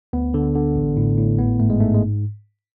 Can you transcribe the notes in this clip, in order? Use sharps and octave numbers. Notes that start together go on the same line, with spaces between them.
D2 B3
D3
D3
A1
A2
A2
G#1 B3
G#2 A3
G#3
G#2 A3
G#3